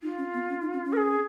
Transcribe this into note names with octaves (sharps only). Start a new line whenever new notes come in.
D#4 F4
C#4
B3
C#4
D#4
C#4
C#4
A#4
G#4